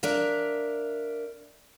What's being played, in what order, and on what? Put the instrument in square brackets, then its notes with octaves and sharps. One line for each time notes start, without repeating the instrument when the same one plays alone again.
[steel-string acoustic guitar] D4 A#4 E5 F5